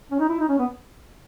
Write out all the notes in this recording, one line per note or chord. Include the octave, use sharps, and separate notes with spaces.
C#4
D#4
E4
D#4
C#4
B3